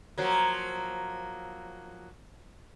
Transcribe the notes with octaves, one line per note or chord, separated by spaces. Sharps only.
F3 F#3 A#3